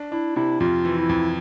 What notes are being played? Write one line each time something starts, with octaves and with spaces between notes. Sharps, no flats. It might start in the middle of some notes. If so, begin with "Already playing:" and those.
Already playing: D4
D4 E4
C3 E4
F2 F4
E3
E4
F2